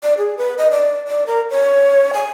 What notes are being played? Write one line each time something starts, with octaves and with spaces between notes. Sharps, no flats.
D5
G#4
B4
D#5
D5
D5
A#4
C#5
G#5